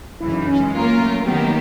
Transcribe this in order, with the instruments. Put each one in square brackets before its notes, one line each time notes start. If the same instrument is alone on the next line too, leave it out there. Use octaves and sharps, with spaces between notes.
[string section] F#2 C#3 E3 [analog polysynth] E4
[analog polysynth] D#4
C#4
G#3
[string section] F#3 A#3 C#4 F4 A#4
[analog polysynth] A3
[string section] D#3 F#3 A#3 D#4 G4 [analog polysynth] B3